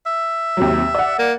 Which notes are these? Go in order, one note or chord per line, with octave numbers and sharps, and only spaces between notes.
E5
D#2 C3 F#3
D5 F#5
A#3